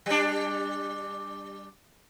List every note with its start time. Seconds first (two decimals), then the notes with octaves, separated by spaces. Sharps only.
0.06 G3 D4